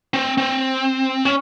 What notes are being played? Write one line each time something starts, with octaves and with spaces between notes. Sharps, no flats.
C4
C4
C#4